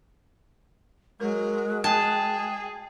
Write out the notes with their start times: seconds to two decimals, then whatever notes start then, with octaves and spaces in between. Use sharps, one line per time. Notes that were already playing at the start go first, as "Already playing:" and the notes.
1.20 F#3 G#3 A#4
1.84 G#4 G5 A5